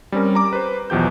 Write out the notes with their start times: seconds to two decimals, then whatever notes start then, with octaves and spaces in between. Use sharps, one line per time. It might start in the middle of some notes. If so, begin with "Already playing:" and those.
0.12 G3 C4 C#4 A#4
0.35 A#5 D6
0.53 B4 C5
0.90 B1 E2 F3 G4 G6